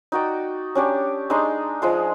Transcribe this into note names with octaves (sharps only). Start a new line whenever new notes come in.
D#4 F#4 D5 G5
C#4 D4 G4 C#5
G#3 D4 D#4 C6
F3 G#3 C6